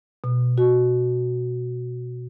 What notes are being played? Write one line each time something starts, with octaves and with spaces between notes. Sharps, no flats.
B2
F#4